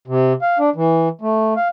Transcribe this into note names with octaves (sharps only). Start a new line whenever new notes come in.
C3
F5
D4
E3
A3
F5